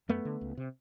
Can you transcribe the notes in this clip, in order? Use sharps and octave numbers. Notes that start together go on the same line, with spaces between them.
F#2 A3 B3
D3
C#2
C3